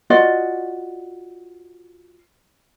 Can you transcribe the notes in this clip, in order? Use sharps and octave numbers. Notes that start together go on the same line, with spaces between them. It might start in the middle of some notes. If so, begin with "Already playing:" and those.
F4 F#4 D5 D#5